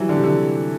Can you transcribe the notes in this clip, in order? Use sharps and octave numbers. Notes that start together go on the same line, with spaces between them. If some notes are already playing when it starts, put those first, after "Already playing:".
Already playing: E3 F#3 G3
D3
C3
D3